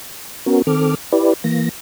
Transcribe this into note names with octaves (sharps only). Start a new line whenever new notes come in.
B3 C#4 F#4 A#4
D#3 C4 A4 D6 F6
E4 G4 B4 D5
E3 A#3 A#6